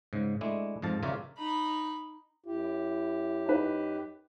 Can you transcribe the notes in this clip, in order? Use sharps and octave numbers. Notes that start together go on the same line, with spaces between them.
G#2 C#3
G#3 A3 D4 E4
F2 G#2 F5 A5
C#3 F4 A#4 C#5 D5 E5
D#4 B5
F#2 E4 G4
D#4 B4